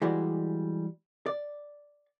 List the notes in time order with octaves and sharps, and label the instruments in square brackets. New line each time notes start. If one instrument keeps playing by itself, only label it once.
[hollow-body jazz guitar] E3 G3 G#3 F#4 D5
D5